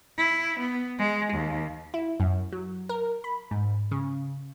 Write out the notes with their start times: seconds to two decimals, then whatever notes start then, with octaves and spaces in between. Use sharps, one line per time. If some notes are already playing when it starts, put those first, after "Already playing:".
0.18 E4
0.60 B3
0.98 G#3
1.33 D#2
1.94 E4
2.20 F#2
2.53 F#3
2.89 A#4
3.24 B5
3.51 G#2
3.91 C#3